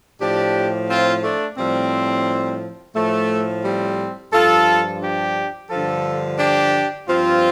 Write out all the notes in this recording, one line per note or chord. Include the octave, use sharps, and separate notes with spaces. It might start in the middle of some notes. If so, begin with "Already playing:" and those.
A2 F3 D4 G4
C4 F4
A3 D4
A2 F3 G3 C4
A2 F3 A3
G3 C4
G2 F3 F4 A4
D4 G4
G2 D3 F3 F4 A4
D4 G4
G2 F3 C4 F4